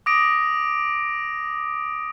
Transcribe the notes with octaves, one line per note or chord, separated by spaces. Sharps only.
D6 D#6 A#6 D7